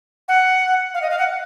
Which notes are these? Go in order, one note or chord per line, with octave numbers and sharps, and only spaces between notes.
F#5
F5
D#5
F5
F#5